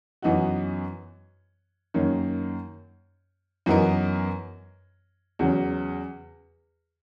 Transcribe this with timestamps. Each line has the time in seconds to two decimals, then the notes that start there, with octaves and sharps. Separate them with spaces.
0.22 F#2 E3 B3 D#4 F#4
1.94 F#2 D#3 A#3 C#4
3.66 F#2 E3 B3 D#4 A#4
5.39 E2 C#3 F#3